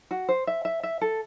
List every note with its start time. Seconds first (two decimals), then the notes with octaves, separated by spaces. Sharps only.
0.11 F#4
0.29 C5
0.47 E5
0.65 E5
0.83 E5
1.01 A4